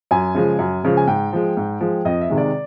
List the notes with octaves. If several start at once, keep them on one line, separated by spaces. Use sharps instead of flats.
F#2 G#5
C#3 F3 G#3
F#2
C#3 F3 G#3
G#5
G#2 G5
F3 G#3
G#2
F3 G#3
F2 D#5
E5
C3 D#3 G#3
D5